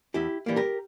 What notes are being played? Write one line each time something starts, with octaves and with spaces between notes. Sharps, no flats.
E2 E4 G4
E3 G3 A#3
G4 A#4